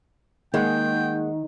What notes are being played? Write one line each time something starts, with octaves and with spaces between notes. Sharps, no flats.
D#3 G#3 A#3 F#5 G5